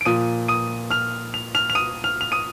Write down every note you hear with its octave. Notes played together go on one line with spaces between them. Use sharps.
D7
A#2 F3 D#6 D#7
D#6 D#7
F6 F7
F7
F6 F7
F7
D#6 D#7
F6 F7
F7
D#6 D#7